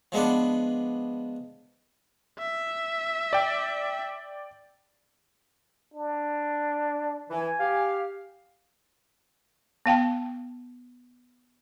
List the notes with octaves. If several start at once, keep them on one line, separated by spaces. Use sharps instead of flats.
F3 G#3 B3 D4
E5
D5 G5
D4
E3 G#5
G4 F5
B3 F5 G5 A5